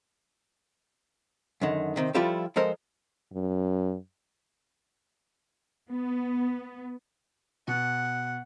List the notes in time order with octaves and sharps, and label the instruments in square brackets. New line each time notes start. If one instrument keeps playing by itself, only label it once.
[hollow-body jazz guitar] F#2 D3 D#3
C3 D#3 C4
F3 G3 E4 F4 G4 A4
F3 G#3 A4 A#4 C5
[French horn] F#2
[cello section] B3
[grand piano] B2 [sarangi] F#5